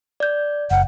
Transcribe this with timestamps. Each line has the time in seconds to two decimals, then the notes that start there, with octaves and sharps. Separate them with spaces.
0.20 D5 G6
0.71 F#1 F#5